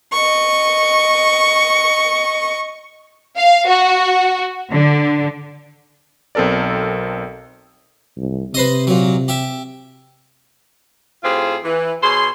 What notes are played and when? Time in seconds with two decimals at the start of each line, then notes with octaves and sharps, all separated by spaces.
0.13 D#5 C#6
3.36 F5
3.68 F#4
4.71 D3
6.35 B1 C4 A4 A#4 D5
8.17 C2
8.54 C3 B4 C5 D#5
8.87 A#2 F#3
9.28 G4 E5
11.24 A2 C4 F4 G4 G#4
11.64 E3
12.02 B2 G#4 C#5 C6